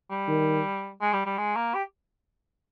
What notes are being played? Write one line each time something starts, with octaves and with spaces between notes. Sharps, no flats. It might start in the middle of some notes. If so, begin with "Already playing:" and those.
G3
D#3
G#3
G3
G3
G#3
A#3
G4